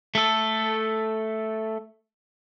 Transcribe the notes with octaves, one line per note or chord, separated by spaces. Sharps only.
A3 A4